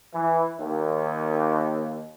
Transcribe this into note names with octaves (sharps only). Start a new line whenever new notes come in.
E3
D#2